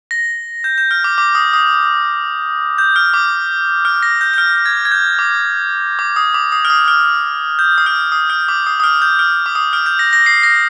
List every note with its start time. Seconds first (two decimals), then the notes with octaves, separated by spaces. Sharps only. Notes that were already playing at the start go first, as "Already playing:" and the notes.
0.11 A#6
0.64 G6
0.78 G6
0.91 F6
1.04 D6
1.18 D6
1.35 D#6
1.53 D#6
2.78 G6
2.96 F6
3.14 D6
3.85 F6
4.03 A#6
4.21 G6
4.34 G6
4.38 F6
4.66 G#6
4.85 G#6
4.91 G6
5.19 D6
5.99 D6
6.16 D#6
6.34 D6
6.52 D#6
6.65 F6
6.70 D#6
6.88 F6
7.59 G6
7.78 D#6
7.86 F6
8.12 D#6
8.30 F6
8.48 D6
8.66 D#6
8.80 D#6
8.84 F6
9.02 G6
9.19 F6
9.46 D6
9.55 D#6
9.73 F6
9.86 G6
9.99 A#6
10.13 A#6
10.26 C7
10.43 A#6